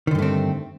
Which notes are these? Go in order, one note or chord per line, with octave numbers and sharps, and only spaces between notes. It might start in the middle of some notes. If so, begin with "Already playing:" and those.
G2 D3 D#3 A3 C4